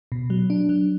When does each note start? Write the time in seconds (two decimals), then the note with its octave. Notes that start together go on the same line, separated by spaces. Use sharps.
0.12 B2
0.30 F#3
0.50 D4
0.69 F#3